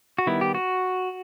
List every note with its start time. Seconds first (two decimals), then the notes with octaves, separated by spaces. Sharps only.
0.18 F#4
0.27 D#3 G3 B3 E4
0.41 G4
0.55 F#4